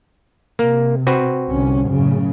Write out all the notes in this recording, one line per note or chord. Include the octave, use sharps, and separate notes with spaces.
C3 A#3
C4 F#4 B4
C2 D3 C#4
F#2 A2 C#3